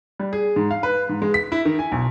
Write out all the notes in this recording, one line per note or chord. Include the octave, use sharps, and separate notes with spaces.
G3
G#4
G#2
F5
B4
G#2
G#3
B6
E4
D#3
G#5
B1